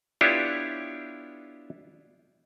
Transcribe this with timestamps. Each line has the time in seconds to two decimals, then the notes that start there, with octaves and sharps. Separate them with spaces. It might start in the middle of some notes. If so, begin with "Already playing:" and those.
0.21 B3 D4 E4 F4 G4 C#5